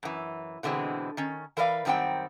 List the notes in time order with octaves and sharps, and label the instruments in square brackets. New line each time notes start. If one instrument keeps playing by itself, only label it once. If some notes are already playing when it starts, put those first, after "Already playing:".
[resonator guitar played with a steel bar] F#2 E3
B2 D3 E3 G#3 C4
D#3 C#4
E3 A#4 B4 D5 F5
F#2 D#3 G3 C4 F#5 G5